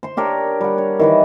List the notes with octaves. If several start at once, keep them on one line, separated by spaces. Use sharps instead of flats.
C5 C6
D4 G4 A#4 C#5
G3 F#5
C#5
D#3 E3 B4